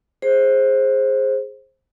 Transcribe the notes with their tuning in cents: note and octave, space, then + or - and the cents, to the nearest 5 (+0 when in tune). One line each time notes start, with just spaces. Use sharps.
G#4 +0 C5 +15